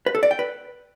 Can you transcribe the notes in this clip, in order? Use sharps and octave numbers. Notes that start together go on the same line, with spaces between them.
B4
A4
D5
G5
B4